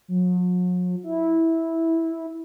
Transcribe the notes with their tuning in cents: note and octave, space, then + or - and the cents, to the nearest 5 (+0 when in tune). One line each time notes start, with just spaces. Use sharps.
F#3 -45
E4 -10